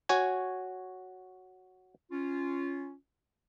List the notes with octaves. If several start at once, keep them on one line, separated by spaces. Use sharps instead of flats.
F#4 C#5 G#5
C#4 F4